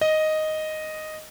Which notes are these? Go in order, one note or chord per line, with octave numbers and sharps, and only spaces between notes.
D#5